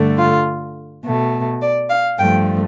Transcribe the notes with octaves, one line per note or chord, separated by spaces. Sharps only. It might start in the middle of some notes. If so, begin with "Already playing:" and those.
Already playing: G2 D3 A3
F4
B2 A3
D5
F5
G2 F3 A3 G5